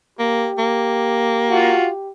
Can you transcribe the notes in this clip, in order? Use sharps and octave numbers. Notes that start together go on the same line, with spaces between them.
A#3 G4
A#3
F4 F#4